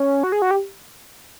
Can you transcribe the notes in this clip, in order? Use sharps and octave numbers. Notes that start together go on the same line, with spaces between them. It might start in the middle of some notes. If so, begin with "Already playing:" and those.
Already playing: C#4
F#4
G#4
F#4
G4